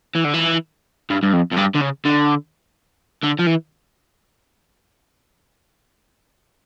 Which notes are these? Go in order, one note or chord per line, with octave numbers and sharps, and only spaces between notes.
E3
D3
E3
G2
G2
F2
F2
G2
D3
C#3
D3
D3
F3
E3